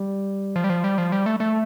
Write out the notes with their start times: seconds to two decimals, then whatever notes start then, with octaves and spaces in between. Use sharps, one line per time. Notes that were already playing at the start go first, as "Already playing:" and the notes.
Already playing: G3
0.56 F3
0.64 G3
0.70 F3
0.84 G3
0.98 F3
1.12 G3
1.26 A3
1.40 A3